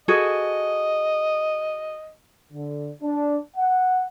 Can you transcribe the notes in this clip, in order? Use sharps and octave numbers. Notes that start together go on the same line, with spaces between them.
F#4 G#4 A4 D#5
D3
D4
F#5